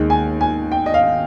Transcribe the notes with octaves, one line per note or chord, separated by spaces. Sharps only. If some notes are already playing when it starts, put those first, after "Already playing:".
Already playing: D#2 D#3 G#3
G#5
G#5
G5
D#5
F5